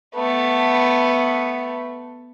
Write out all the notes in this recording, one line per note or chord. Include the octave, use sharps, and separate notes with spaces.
A3 B3